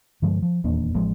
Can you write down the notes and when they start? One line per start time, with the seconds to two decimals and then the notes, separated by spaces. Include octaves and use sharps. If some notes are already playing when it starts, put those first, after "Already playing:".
0.22 G2 D3 F3 G#3
0.42 F3
0.64 D#1 E2 A#3 D4
0.94 A1 F3 G#3